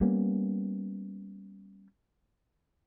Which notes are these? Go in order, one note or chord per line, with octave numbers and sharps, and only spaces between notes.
G3 A#3 B3 C#4